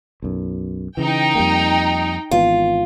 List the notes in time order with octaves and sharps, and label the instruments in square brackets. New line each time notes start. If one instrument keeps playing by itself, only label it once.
[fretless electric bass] B1 F#2
[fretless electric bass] C#3 E3 [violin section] D#4 G5
[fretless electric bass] F2 G3 A#3
[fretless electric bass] G#1 E3 B3 [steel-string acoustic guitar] F4